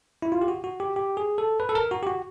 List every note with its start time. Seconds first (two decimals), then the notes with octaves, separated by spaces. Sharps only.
0.22 E4
0.32 F4
0.41 G4
0.48 F#4
0.64 F#4
0.80 G4
0.96 G4
1.17 G#4
1.38 A4
1.60 B4
1.69 A4
1.75 A#4
1.91 F#4
2.03 G4
2.07 F#4